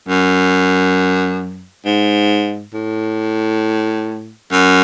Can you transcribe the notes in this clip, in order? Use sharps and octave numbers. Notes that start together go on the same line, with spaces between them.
F#2
G#2
A2
F#2